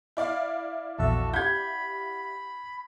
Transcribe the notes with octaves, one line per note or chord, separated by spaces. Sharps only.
E4 D5 F5
A#1 E2 F#4 A4 E5 A5
G4 F#5 B5 G6 G#6